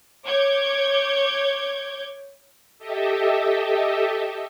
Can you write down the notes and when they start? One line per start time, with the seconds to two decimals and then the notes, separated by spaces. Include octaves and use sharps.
0.25 C#5 D6 G6 G#6
2.79 G4 A4 D#5 E5